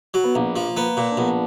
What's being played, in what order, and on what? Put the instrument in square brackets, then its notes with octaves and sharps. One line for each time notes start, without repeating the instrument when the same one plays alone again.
[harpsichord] F#3
[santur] B3
[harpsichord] A#1 [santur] A#3
[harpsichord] F3
[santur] A#3 [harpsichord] B3
[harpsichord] A#2
[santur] D4
[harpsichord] A#1 [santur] B3